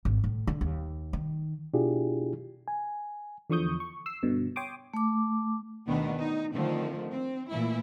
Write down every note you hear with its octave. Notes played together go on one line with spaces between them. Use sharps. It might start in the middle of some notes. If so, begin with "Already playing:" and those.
G#1
A2
D3
D#2
D#3
B2 D4 E4 F4 G4 G#4
G#5
E2 D3 F3 C#6 D#6 G6
C#6
E6 C7
G2 B2 D3
C#5 G5 C6 D6 D#6
A3 D6
D2 B2 D#3 B3 D4
D#4
D3 D#3 F3 A3 C4
C4
A#2 E3 A3 E4